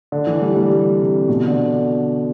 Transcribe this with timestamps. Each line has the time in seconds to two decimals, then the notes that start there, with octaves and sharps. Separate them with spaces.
0.12 D3
0.27 E3
0.42 G3
0.56 G3
0.70 G3
0.99 C3
1.28 B2
1.48 D3